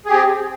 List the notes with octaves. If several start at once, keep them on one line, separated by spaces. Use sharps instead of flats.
C4 G4 G#4